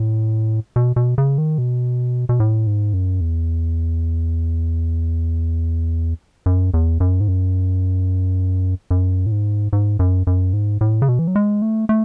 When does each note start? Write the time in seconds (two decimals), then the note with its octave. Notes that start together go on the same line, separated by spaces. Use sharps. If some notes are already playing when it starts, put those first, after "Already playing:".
Already playing: A2
0.76 B2
0.96 B2
1.18 C#3
1.38 D#3
1.58 B2
2.29 B2
2.40 A2
2.67 G#2
2.93 F#2
3.21 E2
6.46 F#2
6.74 E2
7.00 F#2
7.21 G#2
7.28 F#2
8.91 F#2
9.26 A2
9.32 G#2
9.73 G#2
9.99 F#2
10.27 F#2
10.53 G#2
10.81 A2
11.02 C#3
11.08 B2
11.19 E3
11.28 F#3
11.36 G#3
11.62 A3
11.89 A3